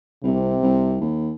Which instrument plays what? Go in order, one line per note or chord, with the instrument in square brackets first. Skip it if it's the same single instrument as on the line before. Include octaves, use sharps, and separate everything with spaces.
[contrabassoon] C2 [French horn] C3
[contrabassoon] C2
D#2